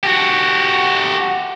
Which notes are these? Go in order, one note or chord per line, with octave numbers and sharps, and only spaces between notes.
F#4 G4